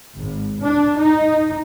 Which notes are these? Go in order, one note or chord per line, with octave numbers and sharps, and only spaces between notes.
G#1
D4
D#4